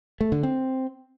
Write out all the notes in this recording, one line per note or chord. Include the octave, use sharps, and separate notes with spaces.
A3
D3
C4